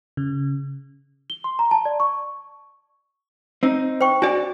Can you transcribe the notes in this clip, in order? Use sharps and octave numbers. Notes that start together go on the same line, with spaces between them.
C#3
G7
C6
A#5
A5
D5
C#6
C4 D#4
C5 G5 C#6
D4 F#4 D5 G#5